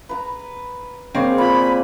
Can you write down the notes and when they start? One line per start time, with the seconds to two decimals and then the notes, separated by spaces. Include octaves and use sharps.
0.09 B4 A#5
1.14 G#3 A#3 C4 C#5
1.38 A#2 G#5 B5